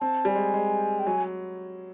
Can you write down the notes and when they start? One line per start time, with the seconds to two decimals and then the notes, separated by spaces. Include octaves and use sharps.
0.01 C4 A5
0.25 G3 G#5
0.35 G#3
0.54 G#3
0.99 G5
1.06 F#3 G#5